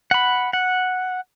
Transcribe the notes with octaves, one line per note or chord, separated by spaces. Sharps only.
F#5 B5
F#5